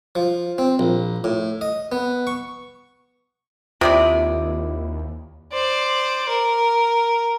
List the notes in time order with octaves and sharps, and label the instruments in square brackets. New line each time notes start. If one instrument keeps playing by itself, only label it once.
[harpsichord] F3
C4
A#1
A2
D#5
B3
C#6
[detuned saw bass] D#2 [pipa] C3 [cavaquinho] E4 D5 D#6 [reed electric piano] F4
[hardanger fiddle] C5 D5
A#4